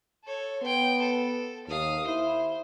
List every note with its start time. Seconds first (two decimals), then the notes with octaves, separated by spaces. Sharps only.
0.24 A4 C#5
0.62 B3 G5 C6
1.01 A4
1.67 D#2 F5 D#6
2.07 E4 C5